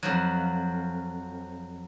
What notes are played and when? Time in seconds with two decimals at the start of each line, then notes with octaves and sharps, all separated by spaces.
0.03 F2 F3 F#3